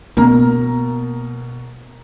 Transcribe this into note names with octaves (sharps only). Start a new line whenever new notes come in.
B2 A#3 A#4 A#5